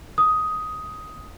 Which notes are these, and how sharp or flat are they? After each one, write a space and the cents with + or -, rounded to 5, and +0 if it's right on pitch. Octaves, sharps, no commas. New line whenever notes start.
D#6 +10